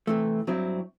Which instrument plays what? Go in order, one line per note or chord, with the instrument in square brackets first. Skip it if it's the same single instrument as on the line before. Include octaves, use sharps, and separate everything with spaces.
[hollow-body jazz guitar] C3 E3 A3
G2 F#3 C4 E4